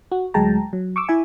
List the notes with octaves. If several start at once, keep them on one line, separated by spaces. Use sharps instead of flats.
F#4
D2 F#3 G#3 G5 A5 A#5
F#3
C#6 D6 E6
E4 E5 G#5